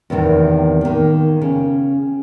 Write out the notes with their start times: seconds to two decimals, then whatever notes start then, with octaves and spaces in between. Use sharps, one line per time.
0.10 E2 A2 C3 D#3
0.81 D#3 A#3
1.41 C#3